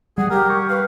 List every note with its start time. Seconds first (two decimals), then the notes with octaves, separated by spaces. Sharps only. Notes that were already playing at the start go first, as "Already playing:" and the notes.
0.18 G3 G#4 F#5
0.30 G4 A#4
0.49 C#6
0.69 B4 F5